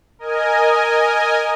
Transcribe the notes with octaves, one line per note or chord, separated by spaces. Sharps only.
A#4 D#5 G#5